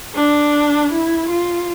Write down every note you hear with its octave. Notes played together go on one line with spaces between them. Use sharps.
D4
E4
F4